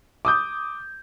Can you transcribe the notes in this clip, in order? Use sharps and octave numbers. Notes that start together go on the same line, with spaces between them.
D6 D#6 G6